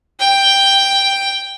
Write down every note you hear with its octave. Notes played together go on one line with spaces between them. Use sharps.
G5